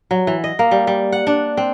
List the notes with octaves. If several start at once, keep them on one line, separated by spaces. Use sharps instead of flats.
F#3
E3
D#5
A#3
G3
G3
F#5
D4
C4